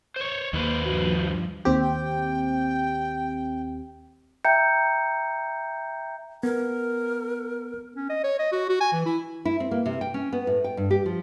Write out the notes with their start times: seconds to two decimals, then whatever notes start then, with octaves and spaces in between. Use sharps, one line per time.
0.16 C5 C#5
0.53 D#2 D#3 A#3 B4 C5
0.85 G2 F3 F#4
1.65 D#2 C4 G4
1.81 G5
4.45 E5 G5 A#5 G6 C#7
6.43 B3 A#4
7.96 C#4
8.10 D#5
8.24 C#5
8.39 D#5
8.52 F#4
8.69 F#4
8.80 G#5
8.92 E3
9.06 E4
9.45 E4
9.60 C4
9.71 A#3
9.86 C3
10.01 G5
10.14 C#4
10.33 B3
10.47 A2
10.64 G5
10.77 G2
10.91 G4
11.06 F3